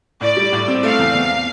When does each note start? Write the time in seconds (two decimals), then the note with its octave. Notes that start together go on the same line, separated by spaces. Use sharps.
0.21 A2 D5
0.37 G3
0.52 A2
0.68 C4
0.83 A3 F5
0.99 E2
1.15 E2